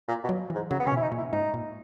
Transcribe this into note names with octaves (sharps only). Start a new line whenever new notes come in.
A#2
B2
F#3
E3
G#2
C#3 F#3
B3
C#3 C#4
B2
E4
D#4
A#2
E4
G#2 D#4
A#2